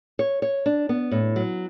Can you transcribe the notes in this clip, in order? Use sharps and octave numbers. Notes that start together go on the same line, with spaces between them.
C#5
C#5
D4
B3
A2
F#3